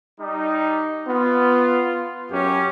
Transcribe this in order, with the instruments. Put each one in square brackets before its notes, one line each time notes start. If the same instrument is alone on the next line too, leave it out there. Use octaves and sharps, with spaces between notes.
[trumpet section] G3 D#4
[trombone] B3 [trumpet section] F4
[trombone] F#2 [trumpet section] C#4 G4